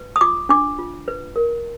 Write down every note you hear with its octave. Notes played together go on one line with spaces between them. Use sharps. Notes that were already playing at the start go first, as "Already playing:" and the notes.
Already playing: B4
D#6
F4 D6
D4 D6
F4
B4
A#4